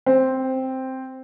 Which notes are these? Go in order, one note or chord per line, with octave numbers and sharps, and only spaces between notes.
C4